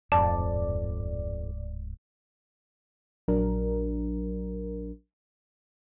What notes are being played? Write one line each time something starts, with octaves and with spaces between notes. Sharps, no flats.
D1 F2 G#2 D5 A5
A#1 F#3 D4 A#4